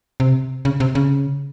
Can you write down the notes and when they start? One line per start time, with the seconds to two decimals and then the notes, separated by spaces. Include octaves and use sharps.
0.20 C3
0.65 C#3
0.80 C3
0.95 C#3